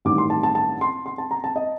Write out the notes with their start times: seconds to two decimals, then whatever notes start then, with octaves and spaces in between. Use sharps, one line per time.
0.05 A1 G2 D#3 D6
0.18 C6
0.30 A5
0.43 A5
0.55 A5
0.81 C6
1.06 C6
1.18 A5
1.31 A#5
1.44 A5
1.56 D#5